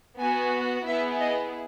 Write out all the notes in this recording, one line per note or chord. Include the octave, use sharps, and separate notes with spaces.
B3 F#4 G#5
B3 E4 G#4 E5
D#5